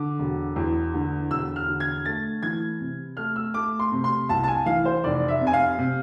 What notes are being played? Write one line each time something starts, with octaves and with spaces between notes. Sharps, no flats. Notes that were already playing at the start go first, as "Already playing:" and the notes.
Already playing: D3 D6
E1
E2
D3
E1 E6
F6
D3
G#6
A3 A6
E3 G#6
C3
A3 F6
E6
A3 D6
C6
C3
C6
C2 A5
A5
G#5
E3 F5
C5
F1 D5
E5
C3
G#5
F5
C3